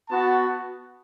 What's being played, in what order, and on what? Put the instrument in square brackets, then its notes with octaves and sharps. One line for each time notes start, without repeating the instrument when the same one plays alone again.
[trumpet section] B3 F#4 A5